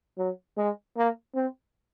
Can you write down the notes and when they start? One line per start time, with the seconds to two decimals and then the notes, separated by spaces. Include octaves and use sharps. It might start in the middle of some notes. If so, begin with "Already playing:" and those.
0.18 F#3
0.57 G#3
0.96 A#3
1.35 C4